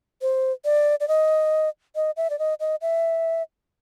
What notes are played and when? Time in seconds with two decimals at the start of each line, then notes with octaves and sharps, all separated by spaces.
0.22 C5
0.65 D5
1.00 D5
1.08 D#5
1.96 D#5
2.17 E5
2.30 D5
2.39 D#5
2.60 D#5
2.82 E5